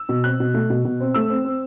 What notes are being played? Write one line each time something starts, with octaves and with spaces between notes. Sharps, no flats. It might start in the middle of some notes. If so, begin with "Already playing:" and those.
Already playing: E6
B2
C4 F#6
B2
A3
B2
B2
C4
A3 E6
C4
C4